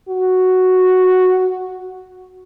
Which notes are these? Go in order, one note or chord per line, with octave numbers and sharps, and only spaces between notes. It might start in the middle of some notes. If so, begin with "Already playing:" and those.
F#4